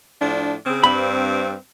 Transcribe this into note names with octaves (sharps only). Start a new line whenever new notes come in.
A2 F3 D4
C#3 C4
G2 C4 B5